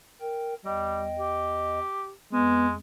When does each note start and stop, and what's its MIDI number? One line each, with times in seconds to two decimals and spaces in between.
0.21 0.54 70
0.21 0.54 79
0.65 1.80 40
0.65 1.11 55
0.65 1.80 75
0.65 1.80 79
1.19 2.12 67
2.33 2.76 41
2.33 2.74 56
2.33 2.67 59